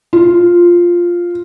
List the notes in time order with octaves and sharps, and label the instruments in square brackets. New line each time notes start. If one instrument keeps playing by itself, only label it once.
[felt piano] F4